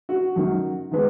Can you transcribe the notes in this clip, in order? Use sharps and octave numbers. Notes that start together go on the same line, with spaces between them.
F#4
F#2 D#3 F#3
D#3 G#3 B3